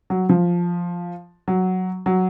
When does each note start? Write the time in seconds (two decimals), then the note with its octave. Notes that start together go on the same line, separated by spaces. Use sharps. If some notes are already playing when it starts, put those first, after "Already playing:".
0.10 F#3
0.29 F3
1.48 F#3
2.06 F#3